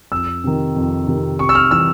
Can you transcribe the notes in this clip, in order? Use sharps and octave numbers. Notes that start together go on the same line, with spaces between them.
F2 E6
C3 D#3
F2
C3 D#3
C3 C#6
E6
F6
E3 G3 E6